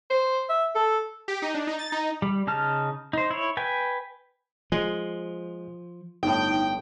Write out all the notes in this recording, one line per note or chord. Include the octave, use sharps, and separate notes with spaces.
C5
E5
A4
G4
D#4
D4
D#4
A6
D#4
G3
C#3 D#4 A5 F6
D#4 C5
E4 C#5
B4 G5 G#5
F3 G#3
G1 A2 D#4 G5